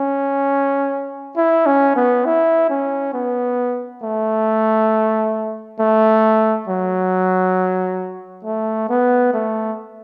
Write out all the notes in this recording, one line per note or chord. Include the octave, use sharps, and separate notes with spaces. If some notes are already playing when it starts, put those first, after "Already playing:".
Already playing: C#4
E4
C#4
B3
E4
C#4
B3
A3
A3
F#3
A3
B3
A3